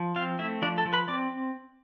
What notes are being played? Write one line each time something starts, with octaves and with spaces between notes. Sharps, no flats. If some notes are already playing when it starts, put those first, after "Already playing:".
Already playing: F3
C4 F4 F5
A3 E4 E5
F3 D4 D5
A4 A5
F3
B4 B5
C4 D5 D6